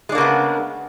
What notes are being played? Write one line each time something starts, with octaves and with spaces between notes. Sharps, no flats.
C#3 G#3 A#3 B3 D4